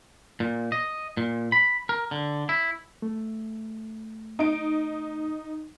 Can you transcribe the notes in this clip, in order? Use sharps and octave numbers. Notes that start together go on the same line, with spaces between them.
A#2
D#5
A#2
B5
A#4
D3
E4
A3
D#4 D7